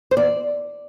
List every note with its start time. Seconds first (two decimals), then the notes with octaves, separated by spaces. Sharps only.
0.11 C5
0.17 E2 D5